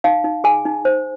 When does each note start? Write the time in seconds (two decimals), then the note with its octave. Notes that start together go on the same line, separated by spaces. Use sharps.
0.04 D#4 F5
0.24 D#4
0.44 G#4 G#5
0.65 D#4
0.85 C5